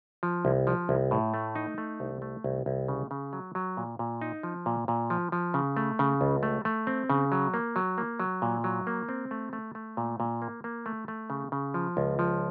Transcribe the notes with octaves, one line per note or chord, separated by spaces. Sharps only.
F3
C2
F3
C2
A2
A3
D#4
A3
C2
A3
C2
C2
C#3
C#3
F#3
F#3
A#2
A#2
D#4
F3
A#2
A#2
F3
F3
C#3
A3
C#3
C#2
A3
A3
C4
C#3
F#3
A#3
F#3
A#3
F#3
A#2
F#3
A#3
C4
A3
A3
A3
A#2
A#2
A#3
A#3
A3
A3
C#3
C#3
F3
C#2
F3